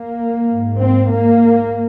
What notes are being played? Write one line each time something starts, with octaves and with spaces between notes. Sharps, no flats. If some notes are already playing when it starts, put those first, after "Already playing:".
Already playing: A#3
G#2
C4
A#3